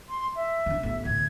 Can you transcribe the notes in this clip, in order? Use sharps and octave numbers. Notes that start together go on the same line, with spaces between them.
C6
E5
E3 D4
A1 B3
D2 A2 G#6